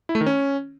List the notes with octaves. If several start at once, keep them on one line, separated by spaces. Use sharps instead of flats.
E4
A3
D#3
C#4